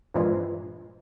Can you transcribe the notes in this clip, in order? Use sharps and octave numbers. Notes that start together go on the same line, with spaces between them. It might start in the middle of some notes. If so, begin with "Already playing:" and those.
G2 A#2 E3 F3 G#3